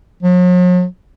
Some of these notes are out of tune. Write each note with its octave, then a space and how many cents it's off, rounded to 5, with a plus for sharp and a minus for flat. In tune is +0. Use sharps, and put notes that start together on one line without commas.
F#3 -45